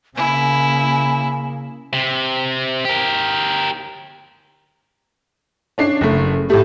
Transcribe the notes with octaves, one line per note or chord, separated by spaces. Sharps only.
C#3 A#3 E4 G#5
C3
G4 A#4
C#4 D4 C7
F#1 A3
A2 A3 G4